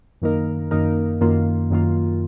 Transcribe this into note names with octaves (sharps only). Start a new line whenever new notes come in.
F#2 D#3 A#3 D#4 A#4
F#2 D#3 A#3 D#4 A#4
F#2 D#3 A#3 F4
F#2 D#3 A#3 F4